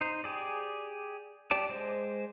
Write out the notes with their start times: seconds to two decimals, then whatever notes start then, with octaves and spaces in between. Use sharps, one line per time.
0.01 D#4 C5
0.24 G4 G#4 D5
1.51 G4 D5 A5 D6
1.70 G#3 C5